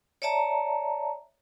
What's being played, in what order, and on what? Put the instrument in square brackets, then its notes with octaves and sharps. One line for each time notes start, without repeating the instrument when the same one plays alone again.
[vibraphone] C#5 D5 E5 A5 A#5